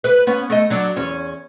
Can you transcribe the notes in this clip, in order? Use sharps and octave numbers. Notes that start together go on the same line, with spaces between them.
B4
B3 C#4
A3 D#5
F#3 D4
E2 C#4